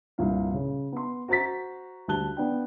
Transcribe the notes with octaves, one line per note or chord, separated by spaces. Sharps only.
C2 G2 A#2 F5
C#3
B3 C6
F#4 C5 A#5 A6 B6
D2 G3 A5 F#6 G7
B3 D4 G5